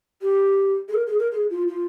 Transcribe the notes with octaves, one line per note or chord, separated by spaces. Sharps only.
G4
G#4
A#4
G#4
A#4
G#4
F4
F4